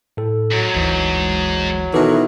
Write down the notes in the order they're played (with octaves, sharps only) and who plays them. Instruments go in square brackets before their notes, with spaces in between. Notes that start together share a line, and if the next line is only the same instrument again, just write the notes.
[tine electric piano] A2 A4
[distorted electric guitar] G#2 [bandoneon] F#3
[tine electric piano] G1 D2 E3 [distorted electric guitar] G#2
[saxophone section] B2 D#3 E3 [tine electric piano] A4